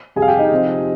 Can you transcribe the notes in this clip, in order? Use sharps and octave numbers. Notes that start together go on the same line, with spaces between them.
F2 C3 G3 G#4 G#5
F5
G4 G5
D#4 D#5
C3 F3 C4